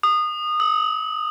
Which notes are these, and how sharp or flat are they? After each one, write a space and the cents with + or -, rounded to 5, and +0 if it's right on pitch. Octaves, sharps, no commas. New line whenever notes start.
D#6 -25
D#6 +45